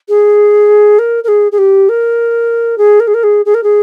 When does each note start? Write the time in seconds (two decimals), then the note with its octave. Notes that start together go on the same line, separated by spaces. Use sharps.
0.09 G#4
0.99 A#4
1.24 A#4
1.28 G#4
1.52 G#4
1.58 G4
1.89 A#4
2.78 G#4
3.00 A#4
3.07 G#4
3.14 A#4
3.23 G#4
3.45 G#4
3.54 A#4
3.63 G#4